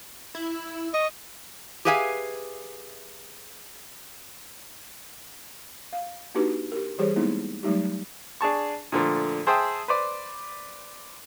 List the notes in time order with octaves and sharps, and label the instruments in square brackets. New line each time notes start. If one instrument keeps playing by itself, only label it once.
[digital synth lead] E4
[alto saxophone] D#5 [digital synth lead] C#6
[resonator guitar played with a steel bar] G4 G#4 B4 E5 F5 G#5
[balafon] F5
A#3 D4 D#4 F#4 G4 B4
G4 A#4
E3 G3 G4 G#4 C5 C#5
G#3 A#3 B3 D#4 E4
F#3 G3 A3 D#4 G4
[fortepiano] D4 G#4 A5 C#6
A#2 D3 F3 A3
G#4 C5 E5 G5 A5 D#6
B4 C5 D5